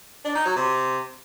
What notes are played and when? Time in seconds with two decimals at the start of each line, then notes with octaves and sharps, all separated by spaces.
0.25 D4
0.35 D#4
0.45 F#3
0.56 C3